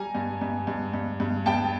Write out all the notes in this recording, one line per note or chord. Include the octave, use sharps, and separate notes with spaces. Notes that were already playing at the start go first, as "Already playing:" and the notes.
Already playing: G3 G#5 A#5
G2
G2
G2
G2
G2
G2 G5 A5